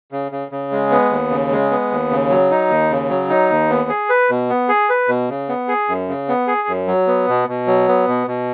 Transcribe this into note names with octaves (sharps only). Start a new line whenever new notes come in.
C#3
C#3
C#3
G#3
B3
D#2
C#3
G#3
B3
D#2
C#3
F#3
D#4
D#2
C#3
F#3
D#4
D#2
B3
G#4
B4
B2
B3
G#4
B4
B2
C#3
B3
G#4
F#2
C#3
B3
G#4
F#2
F#3
B3
B2
B2
F#3
B3
B2
B2